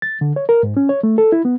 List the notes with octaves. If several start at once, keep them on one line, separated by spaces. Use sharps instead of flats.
A6
D3
C#5
A#4
G#2
C#4
C#5
A3
A4
E4
B3